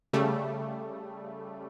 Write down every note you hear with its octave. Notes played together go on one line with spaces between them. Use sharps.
C#3 G3 A3